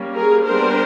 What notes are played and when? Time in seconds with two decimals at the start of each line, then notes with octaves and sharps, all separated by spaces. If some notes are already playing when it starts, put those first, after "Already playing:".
Already playing: G3 A#3 C#4
0.15 G#4 A#4
0.45 G3 B3 D4 A#4 C5